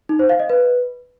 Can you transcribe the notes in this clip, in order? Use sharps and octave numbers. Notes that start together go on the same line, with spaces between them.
D#4
C5
F5
D#5
B4